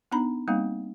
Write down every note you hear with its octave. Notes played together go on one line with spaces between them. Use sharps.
B3 D4 D#4 A#5 B5
G3 A#3 C4 D#4 F5